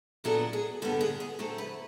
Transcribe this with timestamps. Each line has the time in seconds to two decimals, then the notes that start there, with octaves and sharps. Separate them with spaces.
0.24 A#2 F#3 B3 D4 A4
0.53 G#4
0.82 G2 D3 G3 B3 A4
1.01 G#4
1.20 G#4
1.39 D3 F#3 A3 C4 A4
1.58 B4